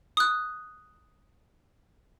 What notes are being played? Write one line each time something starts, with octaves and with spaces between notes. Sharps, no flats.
D#6 F#6